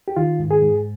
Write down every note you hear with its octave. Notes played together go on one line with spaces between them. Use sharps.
G4
D#3 F4
G#2
G#4
G#2